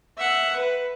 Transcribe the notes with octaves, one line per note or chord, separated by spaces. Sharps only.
E5 F#5
B4